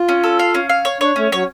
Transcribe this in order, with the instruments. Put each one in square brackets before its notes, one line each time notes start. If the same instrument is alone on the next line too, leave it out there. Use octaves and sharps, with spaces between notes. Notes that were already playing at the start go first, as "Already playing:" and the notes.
Already playing: [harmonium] F4
[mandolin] C#4
A4
F5
C#4
F5
C#5
[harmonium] D4 [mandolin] C#5
[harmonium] A3 [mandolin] C#4
[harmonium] F#3 [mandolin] C#5